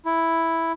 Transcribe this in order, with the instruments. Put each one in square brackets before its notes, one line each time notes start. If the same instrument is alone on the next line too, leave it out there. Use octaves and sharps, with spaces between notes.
[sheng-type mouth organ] E4